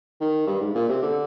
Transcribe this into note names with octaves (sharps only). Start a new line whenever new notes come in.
D#3
G2
G#2
A#2
C3
D3